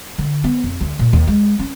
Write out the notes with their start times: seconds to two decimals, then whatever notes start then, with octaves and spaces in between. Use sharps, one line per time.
0.18 D3
0.44 B3
0.64 F2
0.81 D2
0.99 A#2
1.13 D#2
1.28 G#3
1.59 C#4